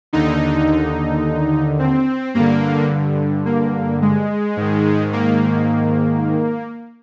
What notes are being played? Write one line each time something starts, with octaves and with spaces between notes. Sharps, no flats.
D#2 D3 D#4
C4
G2 D3 A#3
A#3
G#3
G#2 D#3
A#3